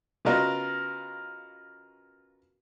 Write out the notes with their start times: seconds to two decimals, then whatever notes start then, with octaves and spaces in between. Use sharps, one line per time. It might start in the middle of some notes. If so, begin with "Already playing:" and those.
0.25 C#3 B3 F4 F#4 A#4 D#5